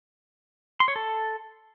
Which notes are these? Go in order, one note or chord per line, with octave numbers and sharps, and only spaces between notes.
C6
C#5
A4